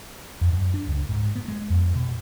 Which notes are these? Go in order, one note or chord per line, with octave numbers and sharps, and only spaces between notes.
F2
F#2
D4
C#2
G#2
B3
G#3
F2
B2